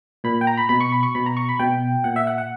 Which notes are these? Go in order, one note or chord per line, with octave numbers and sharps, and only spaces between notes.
A#2 B5
G5
A#5
B5
B2 B5
C#6
B5
C#6
B2 B5
A#5
C#6
B5
B2 G5
A#2 F#5
E5
F#5
F#5